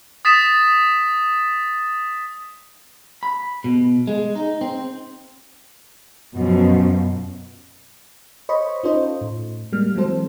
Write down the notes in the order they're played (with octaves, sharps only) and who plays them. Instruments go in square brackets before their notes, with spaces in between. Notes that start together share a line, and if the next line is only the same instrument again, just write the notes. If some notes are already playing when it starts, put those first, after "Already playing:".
[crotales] D#6 A6 B6 E7
[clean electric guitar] B5
B2
G#3
D#4
C4
[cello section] F#2 B2 F3
[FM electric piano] C5 C#5 D#5 B5 C#6
C#4 D#4 F4 A4 C5 D#5
A2
G3 G#3 A#3 F6
E3 F#3 G#3 C4 A4 C5